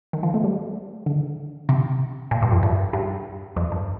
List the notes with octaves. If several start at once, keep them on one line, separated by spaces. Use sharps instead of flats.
D#3
F3
A3
G3
D3
C3
A#2
G2
F2
G2
G2
F2
G2